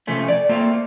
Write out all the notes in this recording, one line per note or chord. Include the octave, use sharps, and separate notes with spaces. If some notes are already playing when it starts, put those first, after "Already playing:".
C3 F3 A3 C#4
D5
A3 A#3 C4 F4